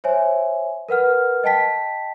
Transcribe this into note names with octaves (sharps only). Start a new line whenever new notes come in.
C5 C#5 E5 G#5
A#4 B4 F#5 F6
D#5 G5 A5 B6